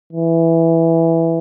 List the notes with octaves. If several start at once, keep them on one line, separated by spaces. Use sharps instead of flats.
E3